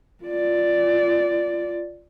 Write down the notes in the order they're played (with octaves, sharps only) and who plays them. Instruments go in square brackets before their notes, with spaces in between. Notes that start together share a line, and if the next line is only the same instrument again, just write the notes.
[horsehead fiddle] F4 D5